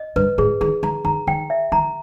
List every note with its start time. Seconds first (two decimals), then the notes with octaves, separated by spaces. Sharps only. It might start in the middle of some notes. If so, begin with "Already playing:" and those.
Already playing: D#5
0.16 G2 B4
0.38 G#2 G#4
0.61 D#3 G#4
0.83 D#3 A#5
1.05 D#3 A#5
1.27 D#3 G5
1.50 E5
1.72 D#3 A#5